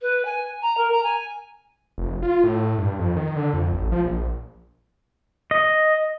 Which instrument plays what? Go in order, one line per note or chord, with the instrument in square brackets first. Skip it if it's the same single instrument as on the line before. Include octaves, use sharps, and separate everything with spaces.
[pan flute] B4
G#5
A#5
A#4
A#5
G#5
[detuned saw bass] F1
F4
A2
G2
F2
D#3
D3
F2
A1
F3
A#1
[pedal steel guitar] D#5